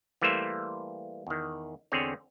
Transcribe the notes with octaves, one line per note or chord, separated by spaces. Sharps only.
E3 G3 A3 A#3 C5 E5
E2 D#3
E2 D3 C4 G#4 C#5